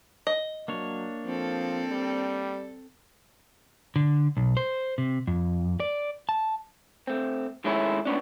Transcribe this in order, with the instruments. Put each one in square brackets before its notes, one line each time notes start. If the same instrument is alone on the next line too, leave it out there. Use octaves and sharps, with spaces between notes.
[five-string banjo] D#5
[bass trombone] F#3 [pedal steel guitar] A#3 D4 C#5
[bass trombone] F3 [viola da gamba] C4 A4
[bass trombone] G3
[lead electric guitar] D3
B1
C5
C3
F2
D5
A5
[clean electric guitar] A3 C4
D#3 G#3 A3 C#4 E4
A3 B3 C#4 D4